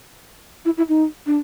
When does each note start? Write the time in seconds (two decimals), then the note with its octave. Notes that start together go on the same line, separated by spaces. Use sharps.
0.65 E4
0.77 E4
0.89 D#4
1.26 D4